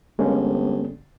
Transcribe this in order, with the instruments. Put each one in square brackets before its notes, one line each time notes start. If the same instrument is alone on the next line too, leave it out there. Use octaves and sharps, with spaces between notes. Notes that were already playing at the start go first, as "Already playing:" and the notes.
[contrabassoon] G1 [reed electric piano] G#3 A#3 C#4